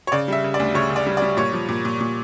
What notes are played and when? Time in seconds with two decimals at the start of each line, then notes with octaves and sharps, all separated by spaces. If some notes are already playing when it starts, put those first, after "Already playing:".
0.07 C#5
0.12 C#3 D5
0.28 G3 E5
0.44 C#3
0.54 D5
0.60 D2
0.74 C#3 C#5
0.90 C#3
0.96 D5
1.07 G3
1.17 D5
1.22 G3
1.37 A#2 C#5
1.53 F3
1.69 A#2
1.85 A#2
2.00 A#2